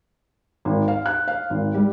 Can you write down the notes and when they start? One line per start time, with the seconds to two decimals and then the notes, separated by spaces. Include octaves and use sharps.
0.65 G#1
0.88 F5
1.06 F#6
1.28 F5
1.50 G#1
1.74 G3